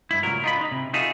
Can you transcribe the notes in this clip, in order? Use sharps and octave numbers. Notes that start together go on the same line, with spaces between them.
G2 E4
C#2 A#2 F#3 A#4
D#4 F4 B5
D4 D#4
C3
D#4 F4 F#4 G#4 A4 E5